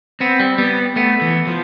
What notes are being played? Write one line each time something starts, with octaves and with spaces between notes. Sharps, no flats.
B3 C4
G3
G3 B3
A3 B3
E3
F3